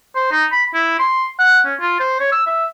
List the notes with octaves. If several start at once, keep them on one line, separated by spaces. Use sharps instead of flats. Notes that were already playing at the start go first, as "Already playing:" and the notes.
C5
D#4
B5
E4
C6
F#5
C#4
F4
C5
C#5
E6
E5